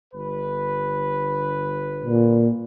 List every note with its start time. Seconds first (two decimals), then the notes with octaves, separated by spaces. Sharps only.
0.14 G1 B4
2.05 A#2